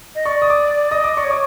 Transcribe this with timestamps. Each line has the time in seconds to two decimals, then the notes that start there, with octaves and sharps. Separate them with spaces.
0.15 D#5
0.26 D5 C#6
0.42 D#6
0.50 D6
0.91 D#5 D#6
1.04 D6
1.16 D5 C#6
1.24 C#5
1.30 D6